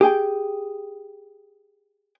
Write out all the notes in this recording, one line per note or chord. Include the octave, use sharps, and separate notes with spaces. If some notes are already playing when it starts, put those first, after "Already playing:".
G4 G#4 G5 G#5